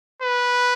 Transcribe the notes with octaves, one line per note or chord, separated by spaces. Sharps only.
B4